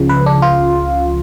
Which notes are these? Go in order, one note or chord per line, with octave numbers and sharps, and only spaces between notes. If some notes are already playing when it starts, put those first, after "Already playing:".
Already playing: C#2 C#3 F3
B4
D4
F4